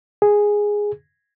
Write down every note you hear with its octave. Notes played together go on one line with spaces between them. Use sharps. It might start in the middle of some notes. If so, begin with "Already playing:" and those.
G#4